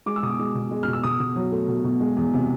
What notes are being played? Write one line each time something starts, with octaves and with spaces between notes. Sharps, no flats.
G#3 D6
E6
B2 D#6
D6
G#3
B2
G#3
B2 F6
E6
B2 D#6
B2
F#3
A3
B2
B2
G#3
E2
C3